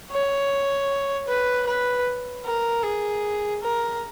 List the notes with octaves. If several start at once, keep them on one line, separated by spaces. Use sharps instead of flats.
C#5
B4
B4
A#4
G#4
A#4